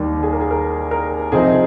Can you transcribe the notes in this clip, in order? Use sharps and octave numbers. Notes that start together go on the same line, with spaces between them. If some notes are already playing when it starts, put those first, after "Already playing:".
Already playing: D#2 D#3 G3
G#4
A#4
G#4
A#4
A#4
C2 C3 F3 C4 D#4 G#4